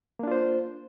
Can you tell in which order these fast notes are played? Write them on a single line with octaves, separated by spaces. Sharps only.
A#3 D4 F4 C5